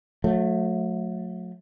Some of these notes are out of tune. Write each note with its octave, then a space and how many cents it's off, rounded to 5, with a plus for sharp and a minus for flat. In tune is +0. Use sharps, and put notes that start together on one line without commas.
F#3 -35 A3 +0